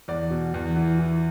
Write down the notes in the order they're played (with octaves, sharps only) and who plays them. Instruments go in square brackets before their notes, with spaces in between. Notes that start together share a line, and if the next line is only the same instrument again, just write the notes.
[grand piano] E2 D5
B2
E2
E3
E3